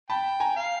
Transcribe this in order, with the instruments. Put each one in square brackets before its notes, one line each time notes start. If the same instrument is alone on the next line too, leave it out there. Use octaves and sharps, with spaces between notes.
[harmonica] G5 [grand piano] A5 B5
[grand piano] G#5 A#5
[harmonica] F5